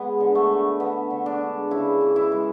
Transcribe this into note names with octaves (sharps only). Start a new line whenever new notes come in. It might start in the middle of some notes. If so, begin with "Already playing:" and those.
Already playing: G#3 B3
D3
A3
D3
D3 B3
D3
D4
G#3
C#3 E4
E3
E4
G#3